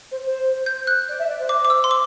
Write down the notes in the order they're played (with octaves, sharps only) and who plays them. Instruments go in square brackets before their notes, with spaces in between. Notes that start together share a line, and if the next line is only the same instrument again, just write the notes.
[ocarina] C5
C5
[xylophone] G6
F#6
[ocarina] D5
E5
D5
C5
[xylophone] D6
D6
E6
C6
D6